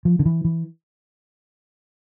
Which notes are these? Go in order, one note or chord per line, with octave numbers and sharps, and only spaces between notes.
F3
D3
E3
E3